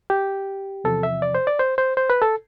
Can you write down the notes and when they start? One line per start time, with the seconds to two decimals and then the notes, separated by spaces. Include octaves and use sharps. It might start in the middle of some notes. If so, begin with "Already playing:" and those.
0.10 G4
0.84 E2 C3 F3 A4
1.03 E5
1.22 D5
1.35 C5
1.47 D5
1.59 C5
1.78 C5
1.97 C5
2.10 B4
2.22 A4